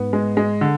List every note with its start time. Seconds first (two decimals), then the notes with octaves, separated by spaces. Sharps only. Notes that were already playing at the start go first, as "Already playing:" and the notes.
Already playing: G#2 B3
0.13 G#3
0.37 G#3
0.61 D3